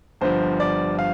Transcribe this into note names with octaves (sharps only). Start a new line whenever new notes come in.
G1 G2 F3 C5
D5
F5